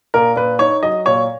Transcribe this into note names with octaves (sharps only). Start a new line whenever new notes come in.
A#2 A#4
A#2 B4
D#4 C#5
F#3 D#5
A#2 C#5